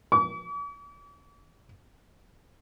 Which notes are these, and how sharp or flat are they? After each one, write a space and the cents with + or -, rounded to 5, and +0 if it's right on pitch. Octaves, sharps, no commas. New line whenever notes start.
D6 -45